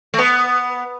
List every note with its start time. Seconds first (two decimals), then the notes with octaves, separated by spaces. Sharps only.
0.14 A3
0.18 B3